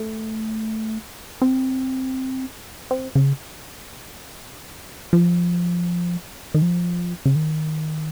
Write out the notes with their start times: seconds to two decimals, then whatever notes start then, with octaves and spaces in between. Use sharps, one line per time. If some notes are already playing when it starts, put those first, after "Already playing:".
Already playing: A3
1.42 C4
2.91 C4
3.15 C#3
5.13 F3
6.55 D#3
6.62 F3
7.26 C#3
7.36 D#3